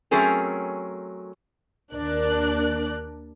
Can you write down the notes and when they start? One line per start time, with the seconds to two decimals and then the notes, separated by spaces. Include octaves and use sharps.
0.11 F#3 A3 C4 C#4 G#4 A#4
1.94 D#2 D4 A#4 D5 F#6